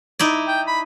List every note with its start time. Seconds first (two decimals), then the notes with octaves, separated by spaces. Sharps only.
0.19 D#4 E4 D5
0.48 G5
0.67 B5